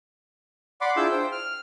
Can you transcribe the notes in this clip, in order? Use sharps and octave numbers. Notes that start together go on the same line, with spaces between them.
D5 F#5 B5 C6 D6
D4 E4 F4 G#4 E6 G6
C5 G5
F6